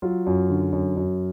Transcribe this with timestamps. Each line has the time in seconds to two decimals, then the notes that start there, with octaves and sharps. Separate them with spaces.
0.02 F#3 F4
0.26 F#2
0.49 D3
0.72 F#2
0.97 F#2